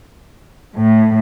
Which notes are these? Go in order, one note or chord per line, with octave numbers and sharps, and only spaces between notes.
A2